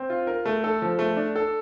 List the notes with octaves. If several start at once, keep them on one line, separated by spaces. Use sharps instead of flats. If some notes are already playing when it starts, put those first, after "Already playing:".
Already playing: C4
F4
A#4
A3
A4
F3
A3
D4
A4